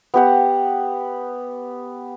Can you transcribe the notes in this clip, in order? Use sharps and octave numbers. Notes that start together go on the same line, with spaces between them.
B3 G4 F#5